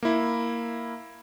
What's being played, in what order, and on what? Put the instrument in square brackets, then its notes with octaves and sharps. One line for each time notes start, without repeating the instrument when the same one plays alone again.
[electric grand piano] A#3 E4